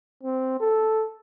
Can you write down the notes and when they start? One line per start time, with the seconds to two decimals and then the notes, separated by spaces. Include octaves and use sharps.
0.24 C4
0.60 A4